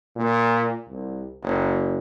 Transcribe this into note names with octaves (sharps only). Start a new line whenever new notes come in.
A#2
C2
F#1